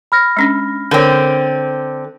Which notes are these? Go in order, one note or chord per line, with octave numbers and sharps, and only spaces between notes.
B5 F6 A#6
G#3 C#4 D4
D3 C4 A#4 C#5